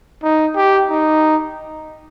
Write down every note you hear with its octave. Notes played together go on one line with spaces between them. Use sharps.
D#4
G4
D#4